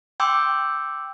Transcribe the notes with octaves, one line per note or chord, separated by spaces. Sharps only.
G5 C6 D6 E6 G6